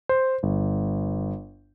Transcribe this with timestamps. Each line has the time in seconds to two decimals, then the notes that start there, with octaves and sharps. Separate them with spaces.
0.09 C5
0.43 G1